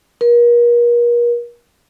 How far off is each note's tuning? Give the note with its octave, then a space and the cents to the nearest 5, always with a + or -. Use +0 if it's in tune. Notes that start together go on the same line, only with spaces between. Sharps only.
A#4 +40